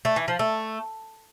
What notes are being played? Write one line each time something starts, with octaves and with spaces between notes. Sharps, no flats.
A3
E3
F3
A3